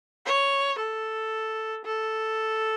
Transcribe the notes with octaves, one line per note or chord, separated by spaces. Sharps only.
C#5
A4
A4